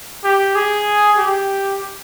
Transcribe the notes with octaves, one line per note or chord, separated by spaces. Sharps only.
G4
G#4
G4